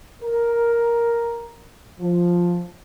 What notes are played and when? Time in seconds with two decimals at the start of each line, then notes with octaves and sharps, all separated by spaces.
0.22 A#4
2.00 F3